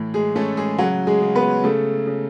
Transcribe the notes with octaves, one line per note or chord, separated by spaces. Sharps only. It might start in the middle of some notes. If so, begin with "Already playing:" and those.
Already playing: A2 E3
G#3 G#4
A3 C#4 A4
G#3 G#4
C#3 F#3 F#4
G#3 G#4
C#3
B3 B4
C#3 A3 A4
C#3